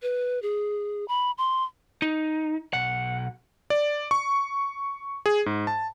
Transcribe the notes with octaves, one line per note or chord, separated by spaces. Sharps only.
B4
G#4
B5
C6
D#4
B1 F#5
D5
C#6
G#4
G#2
A5